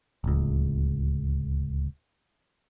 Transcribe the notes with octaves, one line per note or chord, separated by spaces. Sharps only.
D1 C#2